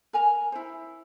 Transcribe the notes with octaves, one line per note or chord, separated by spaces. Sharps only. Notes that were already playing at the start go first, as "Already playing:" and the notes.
A#4 G#5 A#5
E4 C5